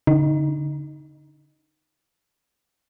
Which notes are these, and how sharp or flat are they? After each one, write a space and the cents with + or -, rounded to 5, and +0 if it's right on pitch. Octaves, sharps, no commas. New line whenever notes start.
D3 -30 D#4 +0